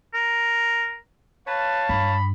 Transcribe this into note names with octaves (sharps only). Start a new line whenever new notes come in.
A#4
B4 C#5 F5 A5
G2 B5